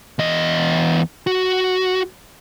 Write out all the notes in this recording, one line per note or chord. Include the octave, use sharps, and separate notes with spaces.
E2 D#5
F#4